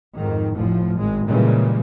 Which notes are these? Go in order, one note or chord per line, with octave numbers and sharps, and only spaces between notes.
F2 G#2 D#3
F1 A2 F3
G#1 G#3
A#2 C#3 E3 G3 G#3